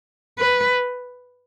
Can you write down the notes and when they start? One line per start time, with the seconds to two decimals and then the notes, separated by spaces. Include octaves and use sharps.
0.39 B4